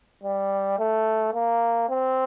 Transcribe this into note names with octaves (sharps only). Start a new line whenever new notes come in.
G3
A3
A#3
C4